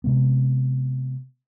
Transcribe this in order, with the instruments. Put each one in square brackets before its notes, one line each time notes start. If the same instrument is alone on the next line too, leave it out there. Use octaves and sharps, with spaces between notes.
[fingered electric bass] C3 G#3 B3